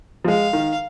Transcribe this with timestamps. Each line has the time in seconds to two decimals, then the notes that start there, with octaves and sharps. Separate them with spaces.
0.24 F3
0.28 G#3 F5
0.53 D#3